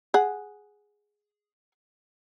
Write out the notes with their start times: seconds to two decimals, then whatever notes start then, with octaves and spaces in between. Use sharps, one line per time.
0.14 G#4 F#5